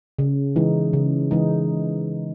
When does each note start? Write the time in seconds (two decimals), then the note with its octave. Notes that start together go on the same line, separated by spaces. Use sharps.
0.19 C#3
0.56 E3 G#3 D#4
0.93 C#3
1.31 E3 G#3 D#4